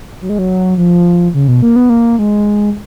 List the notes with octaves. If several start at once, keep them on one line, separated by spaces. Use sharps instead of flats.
F#3
G#3
F#3
F3
C#3
B2
A#3
B3
A#3
G#3